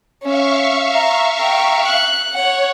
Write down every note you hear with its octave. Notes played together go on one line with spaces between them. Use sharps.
C#4 E5 F5 C#6
A#5
G5 A#5
F#6
C#5 F#5